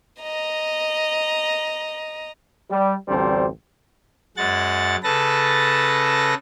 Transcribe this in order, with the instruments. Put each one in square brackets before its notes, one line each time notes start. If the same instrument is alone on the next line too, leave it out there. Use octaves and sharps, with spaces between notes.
[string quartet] D#5 A#5
[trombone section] G3
A1 D2 G3 C4 D4 C5
[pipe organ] F#2 G#3 F#5 A6
C#3 A4 B4 A5 A#6